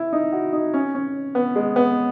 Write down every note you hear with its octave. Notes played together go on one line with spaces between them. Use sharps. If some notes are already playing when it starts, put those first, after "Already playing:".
Already playing: E4
D#4
F#4
D#4
C#4
C#4
B3
G#3
B3